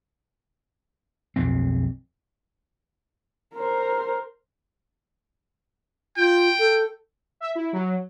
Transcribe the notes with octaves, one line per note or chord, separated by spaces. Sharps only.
B1 F2 C4
A#4 C5
F4 G5
A4
E5
E4
F#3